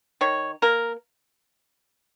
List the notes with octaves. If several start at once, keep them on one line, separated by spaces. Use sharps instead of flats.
D#3 C#5
A#3 A#4